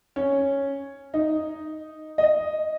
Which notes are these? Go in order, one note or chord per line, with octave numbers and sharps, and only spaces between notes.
C#4
D#4
D#5